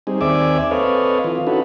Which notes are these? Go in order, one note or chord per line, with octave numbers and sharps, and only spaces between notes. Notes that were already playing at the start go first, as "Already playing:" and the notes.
G3 C4 D#4 G#4
D#2 C4 D5 E5 G#5 D6
C4 A4 B4 C#5 D#5 F5
E3 F4
C#4 D#4 E4 F#4 A4 B4